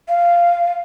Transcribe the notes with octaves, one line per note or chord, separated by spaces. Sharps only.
F5